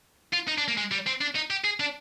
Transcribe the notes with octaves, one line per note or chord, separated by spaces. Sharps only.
F4
D#4
D4
A#3
G#3
G3
C4
D4
D#4
G4
G#4
D4